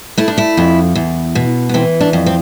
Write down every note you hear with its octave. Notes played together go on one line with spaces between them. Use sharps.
A3 E4
D4
E4
F2
E2
B2
B3
E3 C4
D4
F2
C4